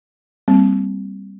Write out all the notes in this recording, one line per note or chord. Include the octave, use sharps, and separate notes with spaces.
G3 A#3 C4